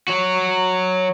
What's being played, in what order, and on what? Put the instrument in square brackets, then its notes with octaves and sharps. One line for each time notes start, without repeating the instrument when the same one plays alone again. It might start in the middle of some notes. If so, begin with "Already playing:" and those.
[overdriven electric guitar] F#3 F#4